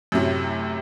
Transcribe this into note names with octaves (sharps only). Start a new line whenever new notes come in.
F#2 A2 C3 F#3